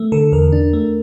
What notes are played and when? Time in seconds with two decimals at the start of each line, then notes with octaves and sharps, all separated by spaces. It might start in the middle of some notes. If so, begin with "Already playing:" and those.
Already playing: A3
0.12 D3 A4
0.32 E2 A#4
0.52 D4
0.73 A3